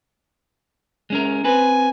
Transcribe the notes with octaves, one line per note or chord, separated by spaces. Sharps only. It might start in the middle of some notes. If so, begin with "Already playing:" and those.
G#3 C#4 A#4
C4 B4 G#5